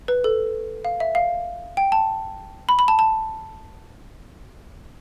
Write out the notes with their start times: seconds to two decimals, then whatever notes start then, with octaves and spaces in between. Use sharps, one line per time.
0.08 B4
0.24 A4
0.85 F5
1.00 E5
1.15 F5
1.77 G5
1.92 A5
2.69 B5
2.79 B5
2.88 A5
2.99 A5